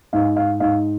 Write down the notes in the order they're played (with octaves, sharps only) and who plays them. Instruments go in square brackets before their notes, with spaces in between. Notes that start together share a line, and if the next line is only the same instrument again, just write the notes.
[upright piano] G#2 F5
F5
G#2 F5